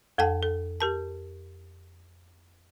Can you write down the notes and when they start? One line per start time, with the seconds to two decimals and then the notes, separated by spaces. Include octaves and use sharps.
0.18 F2 A4 F#5 G5 A5
0.43 A4
0.80 G4 A#4 A5